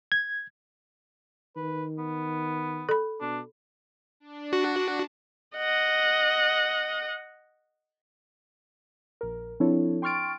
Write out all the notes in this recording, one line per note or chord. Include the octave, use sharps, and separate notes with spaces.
G#6
D#3 B4
B3
A4 B5
B2 D4
D4
F#4
D#5 F#5
A#1 A#4
F3 C4 D4 E4 A4 C#5
G5 C6 C#6 F6 A6 D7